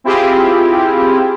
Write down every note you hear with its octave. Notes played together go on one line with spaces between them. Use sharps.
C4 E4 F4 G4 G#4